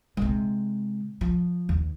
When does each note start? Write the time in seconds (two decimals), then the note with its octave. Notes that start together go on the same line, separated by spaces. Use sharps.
0.17 C3 G#3
1.21 F3
1.69 D#2